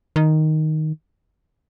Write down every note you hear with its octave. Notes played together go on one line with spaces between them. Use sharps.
D#3